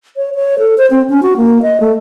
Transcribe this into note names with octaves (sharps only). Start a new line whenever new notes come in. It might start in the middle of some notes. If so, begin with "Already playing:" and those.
C#5
C#5
A4
C5
C4
C#4
F#4
A#3
D#5
A3